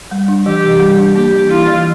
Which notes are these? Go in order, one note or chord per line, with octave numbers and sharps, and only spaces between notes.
G3
D4
E3 G4
C3
G3
D4
A#3 G4
E3
E4 F4
E3